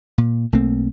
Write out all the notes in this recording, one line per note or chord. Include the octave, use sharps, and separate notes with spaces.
A#2
B1 A3 A#3 C4